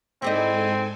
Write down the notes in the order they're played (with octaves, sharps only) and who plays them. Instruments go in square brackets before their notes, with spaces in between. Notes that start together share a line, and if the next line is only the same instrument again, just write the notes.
[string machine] G#2 A4 G#5 [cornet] C4 [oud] E4 G4 D#5